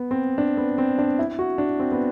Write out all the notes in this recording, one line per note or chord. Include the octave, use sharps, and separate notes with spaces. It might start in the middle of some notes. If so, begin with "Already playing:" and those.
Already playing: B3
C4
D4
B3
C4
D4
E4
F#4
D4
C4
B3